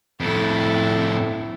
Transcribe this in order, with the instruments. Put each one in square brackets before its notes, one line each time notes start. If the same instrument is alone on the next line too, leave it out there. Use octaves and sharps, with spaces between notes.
[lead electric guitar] F2 A2 [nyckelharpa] E4 A4